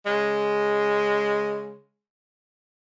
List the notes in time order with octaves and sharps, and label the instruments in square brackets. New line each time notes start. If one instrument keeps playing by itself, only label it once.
[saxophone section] C#3 G#3